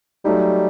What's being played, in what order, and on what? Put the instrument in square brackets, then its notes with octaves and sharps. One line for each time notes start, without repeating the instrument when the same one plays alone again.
[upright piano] F#3 A3 D#4 [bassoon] G3